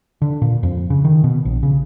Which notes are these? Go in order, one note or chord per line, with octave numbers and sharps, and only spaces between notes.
D3
A#2
F2
C#3
D#3
B2
A#1
C#3